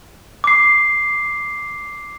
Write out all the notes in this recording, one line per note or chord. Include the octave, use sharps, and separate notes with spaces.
D6 C7